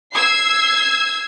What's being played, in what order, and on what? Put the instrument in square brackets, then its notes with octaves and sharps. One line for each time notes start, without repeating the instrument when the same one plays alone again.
[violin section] E6 G#6 C7